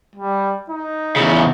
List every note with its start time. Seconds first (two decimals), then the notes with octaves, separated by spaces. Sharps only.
0.16 G3
0.70 D#4
1.16 E2 C#3